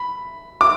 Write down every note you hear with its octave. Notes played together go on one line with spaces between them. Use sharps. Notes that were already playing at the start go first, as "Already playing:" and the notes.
Already playing: B5
D6